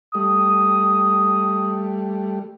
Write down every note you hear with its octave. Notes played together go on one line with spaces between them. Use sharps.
G3 A3 D#6